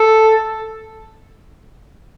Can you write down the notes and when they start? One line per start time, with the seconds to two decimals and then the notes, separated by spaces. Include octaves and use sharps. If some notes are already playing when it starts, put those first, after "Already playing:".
Already playing: A4